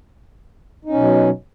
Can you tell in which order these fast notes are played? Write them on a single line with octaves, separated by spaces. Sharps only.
D#4 C#4 B2 F#3